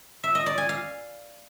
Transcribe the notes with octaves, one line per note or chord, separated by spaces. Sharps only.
E5
D#5
D5
G#5
F5